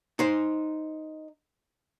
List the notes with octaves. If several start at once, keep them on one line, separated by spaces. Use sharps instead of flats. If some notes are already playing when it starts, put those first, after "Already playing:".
D#4 C5